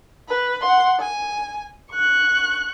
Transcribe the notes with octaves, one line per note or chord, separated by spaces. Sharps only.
B4
F#5 C6
G#5
C#6 F#6